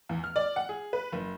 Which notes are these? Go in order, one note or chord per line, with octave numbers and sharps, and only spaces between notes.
E2
F6
D5
F#5
G#4
B4
F#1